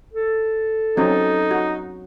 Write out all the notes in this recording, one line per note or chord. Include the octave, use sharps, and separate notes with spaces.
A4
F#3 C4 C#4 D#4
F#4